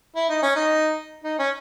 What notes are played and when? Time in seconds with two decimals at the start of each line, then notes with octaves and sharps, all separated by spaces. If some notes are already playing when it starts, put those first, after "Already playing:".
0.16 E4
0.29 D#4
0.42 C#4
0.56 D#4
1.23 D#4
1.39 C#4